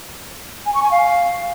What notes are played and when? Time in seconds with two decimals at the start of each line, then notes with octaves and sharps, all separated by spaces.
0.66 G#5
0.74 C#6
0.83 G#5
0.91 F5